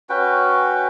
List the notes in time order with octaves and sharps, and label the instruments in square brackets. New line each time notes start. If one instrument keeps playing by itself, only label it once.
[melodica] C#4 F#4 B4 G5